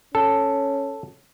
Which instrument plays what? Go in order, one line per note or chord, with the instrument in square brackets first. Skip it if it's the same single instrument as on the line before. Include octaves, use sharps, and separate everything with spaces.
[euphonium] C#4 [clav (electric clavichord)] A4